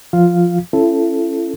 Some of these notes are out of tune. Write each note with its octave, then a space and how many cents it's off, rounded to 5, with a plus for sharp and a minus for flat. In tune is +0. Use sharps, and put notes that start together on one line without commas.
F3 +0 F4 +0 F5 +0
C#4 -15 E4 +40 A4 +0